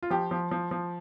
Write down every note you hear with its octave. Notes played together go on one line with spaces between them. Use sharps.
F4
F3 G4
F3
F3
F3